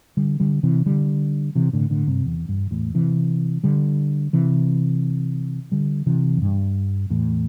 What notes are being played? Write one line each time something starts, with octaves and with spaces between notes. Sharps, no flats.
D3 G3
D3 G3
C3 E3
D3 G3
C3 E3
A2 D3
A2 D3
G2 C3
E2
G2
E2 A2
C3 E3
D3 G3
C3 E3
D3 G3
C3 E3
E2
G2
E2 A2